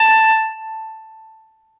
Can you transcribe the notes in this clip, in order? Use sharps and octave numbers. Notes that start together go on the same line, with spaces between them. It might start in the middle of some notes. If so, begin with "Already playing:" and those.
Already playing: A5